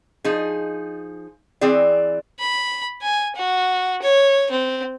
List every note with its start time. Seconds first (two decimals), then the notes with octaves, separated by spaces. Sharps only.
0.24 F3 D#4 G#4
1.61 E3 C4 G#4 D5
2.40 B5
3.02 G#5
3.36 F#4
4.02 C#5
4.51 C4